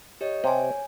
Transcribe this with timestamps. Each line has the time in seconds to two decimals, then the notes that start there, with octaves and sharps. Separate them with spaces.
0.21 G4 C#5 D#5
0.44 C3 C#5 G#5